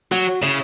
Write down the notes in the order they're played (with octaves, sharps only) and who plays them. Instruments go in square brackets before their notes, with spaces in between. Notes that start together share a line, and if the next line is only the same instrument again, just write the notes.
[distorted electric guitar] F#3 [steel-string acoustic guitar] F#4
[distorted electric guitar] C#3 [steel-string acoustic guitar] E4